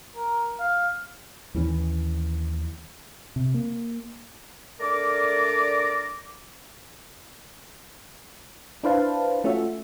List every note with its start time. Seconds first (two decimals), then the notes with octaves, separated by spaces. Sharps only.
0.16 A#4
0.59 F5
1.55 D#2 E3 F#3 C#4
3.36 C3
3.54 A#3
4.80 A3 D4 A#4 D5 A#5 D6
8.83 D4 E4 B4 C5 F5 A5
9.44 A3 C#4 F4 F#4 E5